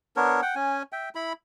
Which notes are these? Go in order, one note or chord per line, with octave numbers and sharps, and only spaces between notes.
B3 D4 A#4 C#5
F#5 G5
C#4 G#5
E5 G5
E4 B5